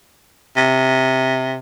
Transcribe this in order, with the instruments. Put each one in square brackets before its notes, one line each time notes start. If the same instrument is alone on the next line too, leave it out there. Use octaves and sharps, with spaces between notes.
[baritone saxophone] C3